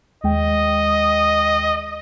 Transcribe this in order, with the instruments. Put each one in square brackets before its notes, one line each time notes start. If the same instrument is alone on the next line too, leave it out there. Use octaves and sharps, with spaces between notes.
[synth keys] D#2 G#3 G5 [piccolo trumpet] D#5